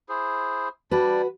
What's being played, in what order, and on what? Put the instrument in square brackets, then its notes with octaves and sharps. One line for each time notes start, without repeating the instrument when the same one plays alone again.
[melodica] E4 G#4 C5
[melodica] G3 D4 D5 [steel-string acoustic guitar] F#4 B4